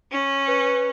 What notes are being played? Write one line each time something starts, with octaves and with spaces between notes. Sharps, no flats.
C#4
B4